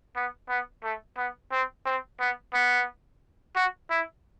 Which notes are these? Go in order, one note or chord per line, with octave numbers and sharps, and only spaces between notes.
B3
B3
A3
B3
C4
C4
B3
B3
F#4
E4